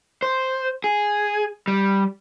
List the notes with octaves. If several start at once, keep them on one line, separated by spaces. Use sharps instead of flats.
C5
G#4
G3